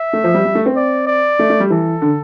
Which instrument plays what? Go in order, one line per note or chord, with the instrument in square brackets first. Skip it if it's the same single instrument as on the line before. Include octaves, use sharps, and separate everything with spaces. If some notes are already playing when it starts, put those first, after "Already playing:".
Already playing: [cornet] E5
[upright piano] A3
F3
G3
G3
A3
C4
[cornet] D5
D5
[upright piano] A3
A3
G3
[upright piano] E3 [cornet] A4
[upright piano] D3